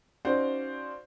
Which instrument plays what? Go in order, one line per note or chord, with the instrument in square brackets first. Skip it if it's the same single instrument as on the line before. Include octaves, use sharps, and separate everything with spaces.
[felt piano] C#4 D#4 F#4 C5 D5 F5